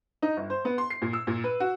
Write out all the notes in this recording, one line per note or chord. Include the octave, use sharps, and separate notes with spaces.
D#4
G1
C5
B3
C6
C7
A#2
E6
A#2
B4
F#4